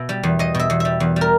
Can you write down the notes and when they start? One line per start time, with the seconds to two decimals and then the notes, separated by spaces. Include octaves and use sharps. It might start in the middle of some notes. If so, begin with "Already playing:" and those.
Already playing: B2 E5
0.09 G3
0.23 E2
0.39 E2 D#5
0.55 B2 E5
0.70 E2
0.80 G3 E5
1.00 E2
1.16 G3
1.21 A#4